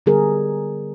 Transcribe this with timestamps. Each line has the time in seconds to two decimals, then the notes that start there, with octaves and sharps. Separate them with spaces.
0.06 D3 G3 B3 G#4 A#4